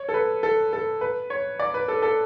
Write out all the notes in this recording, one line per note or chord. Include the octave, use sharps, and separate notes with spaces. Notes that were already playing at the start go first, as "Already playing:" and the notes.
Already playing: C#5
A4
B4
A4
A4
B4
C#5
D5
B4
A4
A4